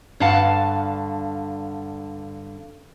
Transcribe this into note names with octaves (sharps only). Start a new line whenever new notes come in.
G2 D3 F5 F#5 A5